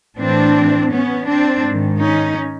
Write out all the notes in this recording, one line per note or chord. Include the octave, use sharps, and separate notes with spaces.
A2 E3 C4 D4
B3 C#4
C4 D4
G#2 D#3
C#4 D#4